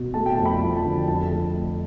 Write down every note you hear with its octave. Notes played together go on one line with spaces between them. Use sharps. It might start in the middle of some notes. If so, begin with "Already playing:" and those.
Already playing: B2
A3 A5
G5
F2 A5
B5
F3
A5
D3
F2 A5
A3